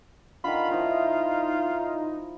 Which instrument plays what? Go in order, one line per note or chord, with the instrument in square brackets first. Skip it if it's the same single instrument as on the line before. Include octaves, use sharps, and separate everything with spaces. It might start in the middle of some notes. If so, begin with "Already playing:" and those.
[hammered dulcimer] D3 D#3 [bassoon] F4 [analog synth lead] B5
[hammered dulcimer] F3 E4 [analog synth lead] D#4